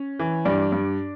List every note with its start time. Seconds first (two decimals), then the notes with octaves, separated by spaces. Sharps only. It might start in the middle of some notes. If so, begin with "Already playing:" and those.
Already playing: C#4
0.19 E3
0.45 G2 D4 D5
0.72 G2